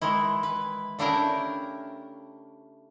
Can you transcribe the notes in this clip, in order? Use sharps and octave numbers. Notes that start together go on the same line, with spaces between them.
D#3 E3 G#3 E4
B4
C#3 A3 D4 E4 G4 A#4